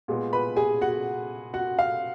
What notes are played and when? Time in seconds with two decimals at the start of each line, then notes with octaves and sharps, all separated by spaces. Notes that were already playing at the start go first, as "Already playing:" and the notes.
0.08 A#2 G#3 B3
0.33 B4 B5
0.57 G#4 G#5
0.81 F#4 F#5
1.54 F#4 F#5
1.79 F5